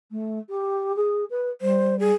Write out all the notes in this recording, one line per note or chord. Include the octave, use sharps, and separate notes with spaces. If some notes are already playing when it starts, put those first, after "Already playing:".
A3
G4
G#4
B4
G3 C5
G#4